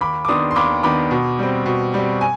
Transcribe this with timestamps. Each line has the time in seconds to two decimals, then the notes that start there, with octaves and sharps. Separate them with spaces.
0.01 D#2 B5 D6
0.25 D6
0.28 D#3 B3 D4 C6 D#6
0.51 C6
0.56 D#2 B5 D6
0.83 D#3 B3 D4 B5 D6
1.11 B2
1.39 G3 C4
1.66 B2
1.94 G3 C4
2.21 G#5